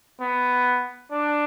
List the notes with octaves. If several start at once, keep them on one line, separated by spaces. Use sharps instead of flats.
B3
D4